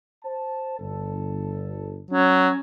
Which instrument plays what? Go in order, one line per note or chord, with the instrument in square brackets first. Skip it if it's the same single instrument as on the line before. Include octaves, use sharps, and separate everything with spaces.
[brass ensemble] C5 A5
G1 A4
[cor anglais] F#3 [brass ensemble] C#4